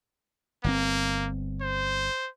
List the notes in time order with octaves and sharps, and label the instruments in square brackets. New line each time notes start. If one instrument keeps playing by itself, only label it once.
[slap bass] G1 A#2 C4 [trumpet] A#3
[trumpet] C5